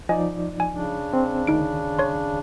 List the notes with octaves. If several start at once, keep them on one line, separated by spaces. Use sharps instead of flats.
F3 D#4 D5 D#5 G#5
G#5
C#3 D4
C4
D2 D#3 D#4 D7
C#5 C6